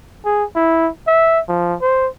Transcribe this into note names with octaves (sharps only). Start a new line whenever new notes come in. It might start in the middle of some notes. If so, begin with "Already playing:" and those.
G#4
E4
E5
F3
C5